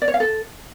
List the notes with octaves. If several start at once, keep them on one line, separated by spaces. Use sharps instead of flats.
D5
C#5
F5
A4